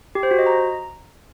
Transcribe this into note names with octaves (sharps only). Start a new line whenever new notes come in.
G4
C5
F#4
D#5
A#5